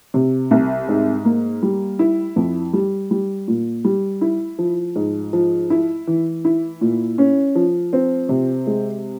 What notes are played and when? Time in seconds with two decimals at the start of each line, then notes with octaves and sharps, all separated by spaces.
0.14 C3
0.51 C2
0.88 G#2
1.25 A#3
1.63 G3
1.99 E4
2.36 F2
2.73 G3
3.11 G3
3.48 A#2
3.84 G3
4.21 E4
4.59 F3
4.96 G#2
5.33 F3
5.70 E4
6.07 E3
6.45 E4
6.81 A#2
7.18 C#4
7.55 F3
7.93 C4
8.29 C3
8.67 G#3